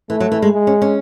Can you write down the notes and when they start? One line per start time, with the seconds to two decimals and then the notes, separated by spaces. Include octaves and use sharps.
0.10 E3 A3
0.20 F#3
0.32 E3
0.42 G#3
0.53 G#3
0.67 C#4
0.82 C#4